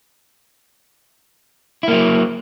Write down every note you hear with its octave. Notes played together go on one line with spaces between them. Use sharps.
F#3 A#3 E4